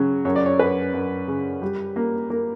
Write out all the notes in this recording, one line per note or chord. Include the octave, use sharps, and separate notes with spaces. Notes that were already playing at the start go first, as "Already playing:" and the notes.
Already playing: C#3 F#3
F#2 C#5
D5
C#5
F#2 B4
F#2
C#3
G3
A#3
A#3 A#4